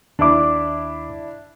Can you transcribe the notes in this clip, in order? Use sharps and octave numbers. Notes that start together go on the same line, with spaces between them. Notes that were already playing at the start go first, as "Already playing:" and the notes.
D#2 D4 E4 D6